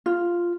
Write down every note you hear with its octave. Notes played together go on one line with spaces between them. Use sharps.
F4